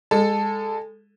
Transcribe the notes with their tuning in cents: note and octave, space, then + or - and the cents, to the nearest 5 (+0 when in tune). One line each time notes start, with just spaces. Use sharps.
G#3 -25 A4 +0